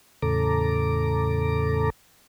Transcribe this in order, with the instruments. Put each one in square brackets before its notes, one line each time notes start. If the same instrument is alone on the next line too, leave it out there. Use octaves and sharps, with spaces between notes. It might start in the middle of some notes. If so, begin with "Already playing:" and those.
[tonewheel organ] E2 A2 C#3 A4 A#5 D6